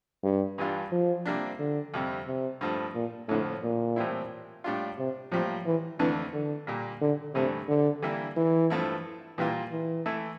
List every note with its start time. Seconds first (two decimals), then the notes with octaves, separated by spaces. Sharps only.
0.24 G2
0.58 G2 E3 G3 D4 F4
0.92 F3
1.26 C3 G3 A#3 D4
1.59 D3
1.94 F2 C3 G3
2.27 C3
2.61 G2 F3 A3
2.95 A#2
3.29 F2 A2 D3 F3
3.63 A#2
3.96 A2 E3 G3 C4 E4
4.64 A2 G3 D4 F4
4.98 C3
5.32 A2 F3 G3 A#3 F4
5.66 E3
5.99 F2 D3 E3 A3 D4
6.33 D3
6.67 A#2 G3 A#3
7.01 D3
7.35 G2 C3 E3 A3
7.69 D3
8.02 E3 G3 A#3 E4
8.37 E3
8.70 G2 F3 A3 E4
9.38 A#2 E3 G3 A#3 F4
9.72 E3
10.06 E3 A3 E4